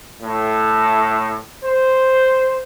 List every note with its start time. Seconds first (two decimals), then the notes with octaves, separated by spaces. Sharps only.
0.22 A2
1.63 C5